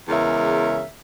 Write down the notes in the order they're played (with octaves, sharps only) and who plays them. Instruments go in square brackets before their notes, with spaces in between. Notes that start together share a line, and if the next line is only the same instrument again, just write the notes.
[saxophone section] E2 C#3 G#3 A#4 E5